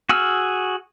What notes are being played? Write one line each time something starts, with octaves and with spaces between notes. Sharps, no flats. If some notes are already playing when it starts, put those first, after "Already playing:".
F#4 G#4 E6 F6